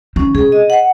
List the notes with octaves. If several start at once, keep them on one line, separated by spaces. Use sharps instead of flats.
D#3 C#4
C3 G#4
D#5
F#5